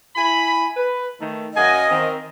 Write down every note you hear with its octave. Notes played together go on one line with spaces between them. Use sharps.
E4 G#5 B5
B4
D#3 A3
F#2 A#3 A#4 D#5 F#5 G#5
D#3 C4